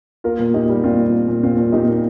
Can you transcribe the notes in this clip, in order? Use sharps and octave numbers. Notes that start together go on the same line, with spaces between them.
A#3 F4 A#4
A#2
A#2 D#4 G4
G3
A#2 C4 F4
A#2
A#3
A#2
A#2 C4 F4
A#2
A#2 D#4 G4
A#3